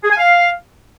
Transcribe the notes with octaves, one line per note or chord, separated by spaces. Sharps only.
G#4
G#5
F5